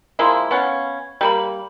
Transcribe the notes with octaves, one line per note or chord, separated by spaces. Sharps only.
F3 G#3 A#3 E4
B3 C#4 F5
G3 A#3 B5